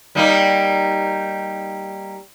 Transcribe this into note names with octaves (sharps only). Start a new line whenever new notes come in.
G3 A#3 D#4